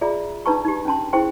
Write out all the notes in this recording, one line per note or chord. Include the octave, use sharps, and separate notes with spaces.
F4 G#4 D5 E5 A#5
D4 D#4 B4 A5 A#5 C#6
D#4 G4
C#4 D4 A5 C6
E4 G#4 C5 G5 C6 C#6